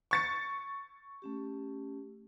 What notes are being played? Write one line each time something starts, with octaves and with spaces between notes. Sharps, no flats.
C#6 A6 C#7
A3 C#4 G4